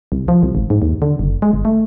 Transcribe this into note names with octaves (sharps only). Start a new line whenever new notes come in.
C2
F3
C2
G#1
G#2
D#2
D3
F#1
G#3
G1
A3